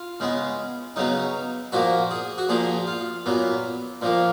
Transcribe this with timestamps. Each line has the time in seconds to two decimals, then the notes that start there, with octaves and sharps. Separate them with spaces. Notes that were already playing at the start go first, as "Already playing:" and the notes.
Already playing: F4
0.20 C#3 G#3 B3
0.96 C#3 F#3 B3 D#4
1.72 A#2 F3 A#3 F#4
2.11 G#4
2.38 F#4
2.49 A#2 F3 A#3 G#4
2.87 F4
3.26 A#2 F#3 B3
4.01 A#2 F3 A#3